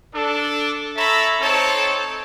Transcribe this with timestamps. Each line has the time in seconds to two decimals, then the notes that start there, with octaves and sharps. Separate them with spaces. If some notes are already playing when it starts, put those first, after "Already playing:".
0.13 D4 A4
0.97 A4 C#5 E5 A#5 B5
1.40 C4 D#4 A4 C#5 A5